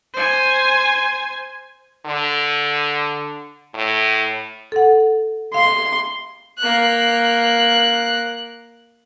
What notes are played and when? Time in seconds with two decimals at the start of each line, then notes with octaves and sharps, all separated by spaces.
0.14 C5 G#5
2.06 D3
3.74 A2
4.72 A4 F#5
5.54 F5 C6
6.58 A#3 F#6